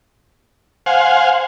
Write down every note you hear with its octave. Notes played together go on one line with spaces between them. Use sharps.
C5 F5 F#5 G#5